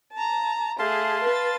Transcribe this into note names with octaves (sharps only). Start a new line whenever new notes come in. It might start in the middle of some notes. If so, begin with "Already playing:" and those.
A5 A#5
A3 G#4 F5 A5 C6
B4 A6